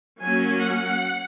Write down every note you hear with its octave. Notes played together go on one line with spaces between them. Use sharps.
F#3 A#3 C#4 G#5
F#5